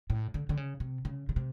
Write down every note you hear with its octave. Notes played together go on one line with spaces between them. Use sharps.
A2
D3
D3
C#3
C3
C#3
C#3
C3